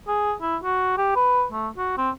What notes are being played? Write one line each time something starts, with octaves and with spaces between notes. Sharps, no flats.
G#4
E4
F#4
G4
B4
A3
F#4
C4